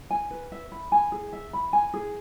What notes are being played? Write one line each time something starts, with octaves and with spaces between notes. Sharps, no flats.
G#5
B4
E5
B5
G#5
G#4
E5
B5
G#5
G#4